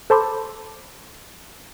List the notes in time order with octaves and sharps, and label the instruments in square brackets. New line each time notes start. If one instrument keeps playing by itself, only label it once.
[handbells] A4 C5 A5 B5 C6 D6